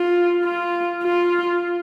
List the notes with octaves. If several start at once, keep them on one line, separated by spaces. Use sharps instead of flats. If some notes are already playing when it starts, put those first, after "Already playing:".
Already playing: F4
F4
F4